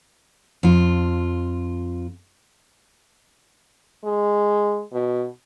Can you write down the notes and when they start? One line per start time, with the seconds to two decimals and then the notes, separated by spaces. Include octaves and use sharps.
0.63 F2 F4
4.04 G#3
4.93 B2